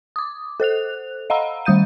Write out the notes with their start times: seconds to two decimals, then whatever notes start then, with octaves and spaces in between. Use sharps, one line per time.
0.16 D6 D#6
0.60 A4 C5 F#6 F7
1.30 D#5 F5 F#5 A#5 B5 E6
1.65 D#3 G3 D#6 G6 D#7